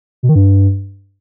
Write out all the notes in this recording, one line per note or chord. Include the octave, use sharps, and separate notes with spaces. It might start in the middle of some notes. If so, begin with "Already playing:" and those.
B2
D#3
G2